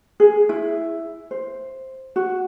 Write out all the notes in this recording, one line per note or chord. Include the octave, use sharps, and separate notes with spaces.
G#4
E4
C5
F#4